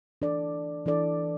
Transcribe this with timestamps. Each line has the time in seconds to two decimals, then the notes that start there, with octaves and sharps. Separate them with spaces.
0.22 E3 D4 A4 D5
0.86 E3 D4 A4 D5